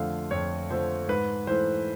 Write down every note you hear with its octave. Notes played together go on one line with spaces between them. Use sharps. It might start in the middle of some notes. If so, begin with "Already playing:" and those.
Already playing: F2 D3 F3 A3 F5
F2 C#5
D3 F3 A3 C5
G#2 B4
E3 A3 C5